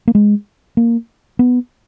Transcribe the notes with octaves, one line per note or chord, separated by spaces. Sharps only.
A#3
G#3
A#3
B3